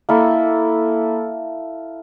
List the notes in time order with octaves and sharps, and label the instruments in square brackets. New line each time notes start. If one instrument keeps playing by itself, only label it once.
[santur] A#3 E4 A4